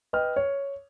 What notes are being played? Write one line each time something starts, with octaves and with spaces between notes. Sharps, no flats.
B4 D#5 G5 F6
C#5